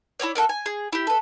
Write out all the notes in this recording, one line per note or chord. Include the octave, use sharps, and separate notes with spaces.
E4 F#4 C#5 D5
F#4 A4 A#4 D5
G#5
G#4
E4 G4
A4 B4